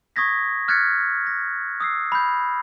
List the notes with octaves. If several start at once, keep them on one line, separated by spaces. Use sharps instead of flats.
C#6 D#6 G#6 A#6 B6
F6 F#6 G#6 A6 B6 C#7
A#6
D#6 E6 C7
B5 G6